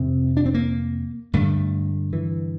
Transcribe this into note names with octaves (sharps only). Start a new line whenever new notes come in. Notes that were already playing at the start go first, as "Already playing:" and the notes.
Already playing: F2 C3 C4
D4
C4
A#3
G2 D3 A3
E3